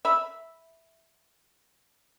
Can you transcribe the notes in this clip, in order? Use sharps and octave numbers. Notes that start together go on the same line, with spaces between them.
E5 B5